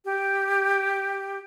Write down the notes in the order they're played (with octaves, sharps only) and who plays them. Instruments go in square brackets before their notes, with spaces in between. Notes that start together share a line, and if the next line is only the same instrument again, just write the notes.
[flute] G4